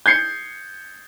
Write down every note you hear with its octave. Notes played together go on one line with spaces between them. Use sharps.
G6 G#6 C7 C#7